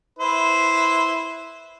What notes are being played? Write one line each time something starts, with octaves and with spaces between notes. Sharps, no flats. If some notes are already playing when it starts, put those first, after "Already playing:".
E4 B4 C5